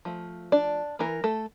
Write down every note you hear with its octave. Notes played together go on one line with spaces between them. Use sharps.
F3 A3
D4 D5
E3 A#3 A#4
A3 A4